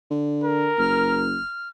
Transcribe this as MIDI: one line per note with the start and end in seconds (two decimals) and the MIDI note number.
0.11 0.71 50
0.44 1.25 70
0.78 1.40 30
0.78 1.69 89